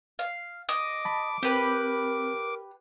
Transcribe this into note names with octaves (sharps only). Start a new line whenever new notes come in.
F5
D#5 D6
A5 B5
C4 G4 A#4 B4